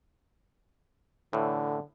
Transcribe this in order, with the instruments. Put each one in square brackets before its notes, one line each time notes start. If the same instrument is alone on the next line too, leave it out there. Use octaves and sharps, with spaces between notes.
[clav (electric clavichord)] A2 E3 [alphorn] D3